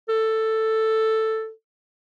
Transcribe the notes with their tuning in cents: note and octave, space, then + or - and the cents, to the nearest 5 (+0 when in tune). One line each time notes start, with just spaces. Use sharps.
A4 +5